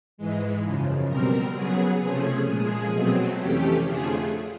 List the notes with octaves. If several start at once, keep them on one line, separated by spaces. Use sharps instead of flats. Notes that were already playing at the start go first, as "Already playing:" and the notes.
G#2 E3 G#3
F#2 C#3 F3
B2 G3 C4 A#4
C#3 F#3 B3 G#4
C3 F3 A3 C#4 G#4
A#2 F3 G#3 G#4
B2 F#3 A3 C4
F2 C3 E3 A3 C#4 G4
F2 D3 F3 A3 G#4